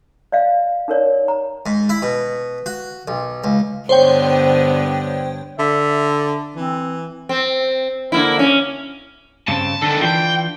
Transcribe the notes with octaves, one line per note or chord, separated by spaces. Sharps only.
D5 D#5 F5
D#4 A#4 C#5 D5
A#5
G#2
E4
B2
F#4
B1
C#2
G2 D3 B3 C5 C#5 G5
D3 E5
E3 C4
C4
D3 A#3 E4
C#4
G2 C#3 C4 A5
D3 D#3 A4
E3 D4 F4 G5